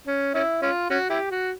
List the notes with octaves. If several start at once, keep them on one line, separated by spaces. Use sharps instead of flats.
C#4
C#4 E4
C#4 F4
C#4 F#4
E4 G4
F#4